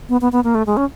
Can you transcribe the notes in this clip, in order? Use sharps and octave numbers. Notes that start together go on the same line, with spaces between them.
B3
B3
B3
A#3
A3
G#3
C#4